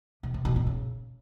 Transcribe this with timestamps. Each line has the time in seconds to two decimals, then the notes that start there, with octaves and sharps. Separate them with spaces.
0.23 C3
0.34 C3
0.45 B2
0.56 B2
0.67 C#3